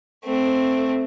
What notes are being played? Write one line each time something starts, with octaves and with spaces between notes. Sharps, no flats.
A3 C4